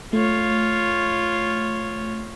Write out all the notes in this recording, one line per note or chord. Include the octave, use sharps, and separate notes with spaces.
A3 F4 C#5